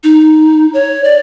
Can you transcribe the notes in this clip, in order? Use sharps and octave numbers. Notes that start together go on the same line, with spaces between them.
D#4
C#5
D5